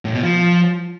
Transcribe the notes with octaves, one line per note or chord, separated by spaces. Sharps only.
A2
B2
F3